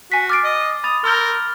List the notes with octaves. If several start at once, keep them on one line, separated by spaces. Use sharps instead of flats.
F#4 G#5 B6
D6 F6 A6 C7 D7
D#5
B5 D#6 A6 F7
A#4 C6 E6 F6 G6 A6 G7